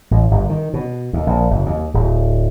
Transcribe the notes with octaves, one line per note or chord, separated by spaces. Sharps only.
A1
G1
D#3
B2
D#2
A#1
F#1
D#2
D1